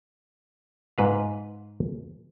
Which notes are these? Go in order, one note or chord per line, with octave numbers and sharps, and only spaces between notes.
G#2 B4 F5